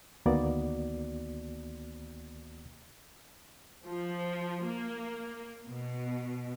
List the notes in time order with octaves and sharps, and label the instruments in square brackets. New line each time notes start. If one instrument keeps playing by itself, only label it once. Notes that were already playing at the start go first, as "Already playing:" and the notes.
[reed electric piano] D2 D#3 A#3 B3 F#4 D5
[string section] F3
A#3
B2